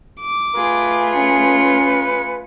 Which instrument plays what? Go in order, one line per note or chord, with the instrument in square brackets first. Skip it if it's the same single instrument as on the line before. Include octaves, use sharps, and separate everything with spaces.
[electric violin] D6
[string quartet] A3 F4 G#4 [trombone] B4
[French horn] C#4 [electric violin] C#7